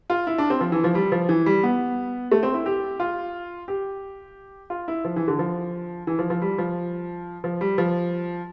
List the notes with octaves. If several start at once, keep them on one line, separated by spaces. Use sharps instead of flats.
F4
E4
D4
C4
F3
E3
F3
G3
F3
E3
G3
B3
A3
C4
E4
G4
F4
G4
F4
E4
F3
E3
D3
F3
E3
F3
F3
G3
F3
F3
G3
F3